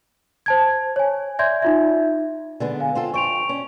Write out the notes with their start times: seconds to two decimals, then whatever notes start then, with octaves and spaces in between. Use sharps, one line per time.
0.46 C5 A5 G#6
0.96 C#5 G#5
1.39 D5 E5 G#5 C6 G6 G#6
1.62 D#4 F4 E5
2.60 D3 G#3 B3
2.80 F5 G#5
2.95 C4 F4 A4
3.14 F2 C5 C#6 D7 F7
3.49 C#4